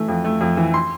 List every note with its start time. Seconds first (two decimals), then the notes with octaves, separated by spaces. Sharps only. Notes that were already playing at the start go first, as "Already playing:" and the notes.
Already playing: E3 A3
0.08 F2
0.24 A3
0.41 F2
0.57 E3
0.74 C6